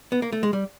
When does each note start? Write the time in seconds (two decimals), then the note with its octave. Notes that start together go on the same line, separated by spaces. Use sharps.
0.12 B3
0.22 A#3
0.32 A3
0.43 G#3
0.53 G3